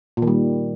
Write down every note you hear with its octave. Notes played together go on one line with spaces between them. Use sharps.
A#2
D#3
G3